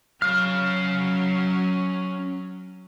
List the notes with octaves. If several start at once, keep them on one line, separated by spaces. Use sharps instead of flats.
F#3 C#4 F5 F6